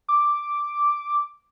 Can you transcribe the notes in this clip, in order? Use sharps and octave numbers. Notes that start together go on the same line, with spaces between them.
D6